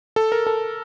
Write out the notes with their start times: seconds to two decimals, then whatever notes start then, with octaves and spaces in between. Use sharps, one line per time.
0.16 A4
0.32 A#4
0.47 A4